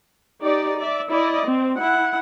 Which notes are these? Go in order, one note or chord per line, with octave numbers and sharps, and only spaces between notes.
D#4 G4 D5
D5 E5
E4 D5 D#5
C4
E4 F#5